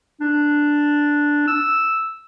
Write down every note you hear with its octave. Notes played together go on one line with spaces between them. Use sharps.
D4
E6